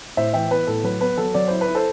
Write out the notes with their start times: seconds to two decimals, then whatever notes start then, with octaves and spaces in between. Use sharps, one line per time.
0.17 A2 C5 E5
0.34 E3 E5 G5
0.51 B3 B4
0.67 A2 A4
0.83 F#3 B4
1.01 B3 B4
1.18 F#3 A4
1.34 F#3 D5
1.48 E4 C5
1.61 B4
1.68 E4
1.75 A4 C5